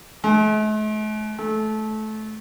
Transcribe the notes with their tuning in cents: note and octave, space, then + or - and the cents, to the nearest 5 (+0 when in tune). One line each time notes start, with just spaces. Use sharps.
A3 -45
A3 -20